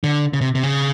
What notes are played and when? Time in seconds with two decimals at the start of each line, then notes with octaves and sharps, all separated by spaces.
0.04 D3
0.33 C#3
0.41 C3
0.55 C3
0.63 C#3